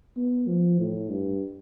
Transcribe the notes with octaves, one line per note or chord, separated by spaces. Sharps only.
B3
F3
A2
G2